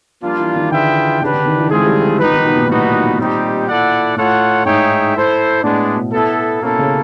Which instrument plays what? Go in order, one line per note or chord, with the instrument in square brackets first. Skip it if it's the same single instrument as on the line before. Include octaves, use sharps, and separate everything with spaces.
[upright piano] F3 [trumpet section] G3 A#3 D4 F4
[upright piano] E3
D#3
[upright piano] D3 [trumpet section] F4 G#4 B4 E5 G5
[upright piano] C#3 [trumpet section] D4 G4 B4
[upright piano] D3
D#3
E3
[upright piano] G#3 [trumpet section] A3 C4 F4 G#4
[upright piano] G3
[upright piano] F3 [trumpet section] B3 D#4 G4 B4
[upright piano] D#3
B2
A#2
[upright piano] A2 [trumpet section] G3 B3 D#4 F#4 B4
[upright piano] A#2 [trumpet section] G3 C4 D#4 G4
[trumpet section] E4 A4 D5 F#5
[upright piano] A2 [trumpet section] F4 A4 C#5 F#5
[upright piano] G#2 [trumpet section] D#4 G#4 C#5 E5 G5
[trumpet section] E4 A4 C5
[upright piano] A2 [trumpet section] G#3 B3 D4
[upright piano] B2
[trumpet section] B3 E4 A4
[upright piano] B2 [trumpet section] A#3 C#4 E4 A4
[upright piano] C#3